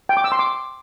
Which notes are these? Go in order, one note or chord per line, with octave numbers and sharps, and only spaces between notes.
G5
D6
E6
C6
D6